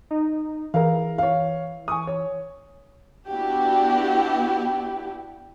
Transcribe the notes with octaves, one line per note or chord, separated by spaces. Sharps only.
D#4
E3 G#4 A#4 F5
C#5 F5
G#5 C#6 D#6
C#5
B3 D4 E4 F#4 G4